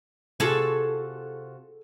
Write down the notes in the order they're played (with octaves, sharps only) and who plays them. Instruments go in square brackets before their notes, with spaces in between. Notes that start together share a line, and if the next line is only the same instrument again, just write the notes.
[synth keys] C3 F4 F#4 [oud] G#4 A4